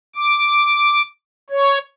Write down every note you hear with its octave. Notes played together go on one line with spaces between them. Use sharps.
D6
C#5